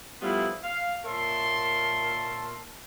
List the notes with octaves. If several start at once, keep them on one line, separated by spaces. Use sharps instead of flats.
F3 G3 A3 B3 E4 F4
F5
A#2 A#4 C#5 E5 A5 C6